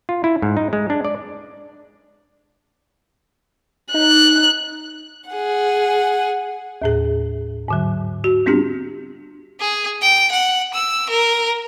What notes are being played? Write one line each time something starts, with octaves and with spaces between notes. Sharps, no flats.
F4
E4
G#2
D#4
G#3
D4
D5
D#4 F#6
G#4 F#5
D#2 A2 G#4
G#2 D3 F#3
F#4
G3 B3 C4 D4 F4 G4
G#4
G5
F#5
E6
A#4